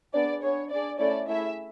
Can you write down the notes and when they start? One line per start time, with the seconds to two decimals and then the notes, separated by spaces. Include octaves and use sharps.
0.14 B3 D4 G#4 D5
0.42 B3 D4 G#4 C#5
0.70 D4 G#4 D5
1.00 A3 C#4 E4 A4 D5
1.28 A3 E4 G#4 E5